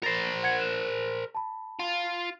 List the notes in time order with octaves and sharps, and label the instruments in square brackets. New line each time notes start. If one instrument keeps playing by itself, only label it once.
[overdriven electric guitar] A#4 C5 [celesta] A6 A#6 C7
[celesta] F#5 G#6 C#7
F#6 E7
A5 B5
[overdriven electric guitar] F4